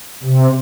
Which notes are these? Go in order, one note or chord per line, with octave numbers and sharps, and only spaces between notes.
C3